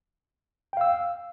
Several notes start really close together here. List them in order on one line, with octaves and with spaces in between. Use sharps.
G5 F5 E6